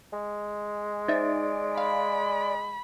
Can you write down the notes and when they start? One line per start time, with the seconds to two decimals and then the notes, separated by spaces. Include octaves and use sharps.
0.13 G#3
1.08 D#4 C5 D5 E5
1.78 F5 B5